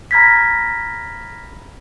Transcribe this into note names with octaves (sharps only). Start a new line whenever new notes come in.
A#5 B5 F6 G#6 A#6 B6